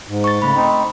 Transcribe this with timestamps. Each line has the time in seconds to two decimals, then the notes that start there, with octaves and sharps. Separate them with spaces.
0.08 G#2
0.24 C#6 A6
0.42 C#3 A3 B5
0.55 C4 D#4